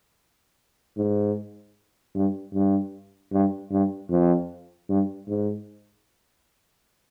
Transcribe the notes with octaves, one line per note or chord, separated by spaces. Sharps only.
G#2
G2
G2
G2
G2
F2
G2
G#2